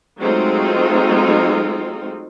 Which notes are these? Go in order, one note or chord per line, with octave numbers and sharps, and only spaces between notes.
F#3 G#3 A3 C4 D#4 F4